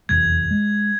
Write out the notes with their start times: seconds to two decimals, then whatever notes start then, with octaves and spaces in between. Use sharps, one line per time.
0.09 F1 B1 E2 G#6
0.51 G#3